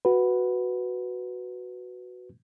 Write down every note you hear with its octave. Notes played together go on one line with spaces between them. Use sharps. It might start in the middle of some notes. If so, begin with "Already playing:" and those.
F#4 B4